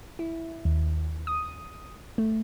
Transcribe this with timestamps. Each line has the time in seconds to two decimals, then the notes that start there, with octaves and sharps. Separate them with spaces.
0.19 E4
0.65 D#2
1.27 D#6
2.18 A3